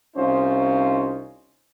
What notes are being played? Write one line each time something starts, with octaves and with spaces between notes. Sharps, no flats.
C2 C#4 D#4 F4 C5